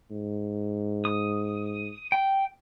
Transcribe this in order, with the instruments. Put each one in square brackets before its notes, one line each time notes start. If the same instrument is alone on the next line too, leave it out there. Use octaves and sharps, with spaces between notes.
[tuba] G#2
[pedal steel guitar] D#6
G5